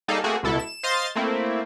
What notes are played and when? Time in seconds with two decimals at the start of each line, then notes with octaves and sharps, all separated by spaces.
0.08 G3 A#3 D#4 G#4 A4 F5
0.24 A3 A#3 C4 F#4 G#4
0.43 C#2 B2 E4 A4
0.59 E7
0.83 C5 D#5 F5 C6 A6
1.15 A3 A#3 C4 E4